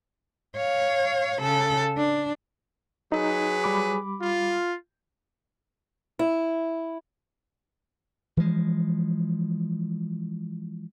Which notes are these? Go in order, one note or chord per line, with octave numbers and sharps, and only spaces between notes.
C#5 F5
C#3 A4
D4
F#3 D#4 G#4 B4
G3 B5 D6
F4
E4
E3 F3 G#3